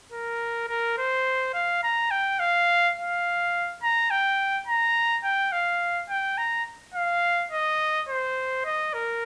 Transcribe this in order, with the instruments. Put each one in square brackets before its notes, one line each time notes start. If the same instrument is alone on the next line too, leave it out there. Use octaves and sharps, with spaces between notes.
[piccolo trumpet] A#4
A#4
C5
F5
A#5
G5
F5
F5
A#5
G5
A#5
G5
F5
G5
A#5
F5
D#5
C5
D#5
A#4